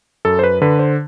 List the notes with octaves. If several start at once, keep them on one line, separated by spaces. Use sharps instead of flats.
F#2 A4
C5
B4
D3 B4
C5